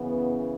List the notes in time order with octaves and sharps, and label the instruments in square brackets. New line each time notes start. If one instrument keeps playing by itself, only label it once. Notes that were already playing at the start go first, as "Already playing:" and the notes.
Already playing: [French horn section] F#2 C#3 E3 B3